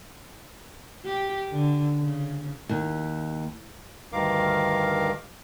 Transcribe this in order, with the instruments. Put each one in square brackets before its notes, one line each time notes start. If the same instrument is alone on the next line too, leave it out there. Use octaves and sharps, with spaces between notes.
[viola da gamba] G4
D3
C#3
[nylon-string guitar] D#2
[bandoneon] D2 G2 D#3 A#4 F5 D6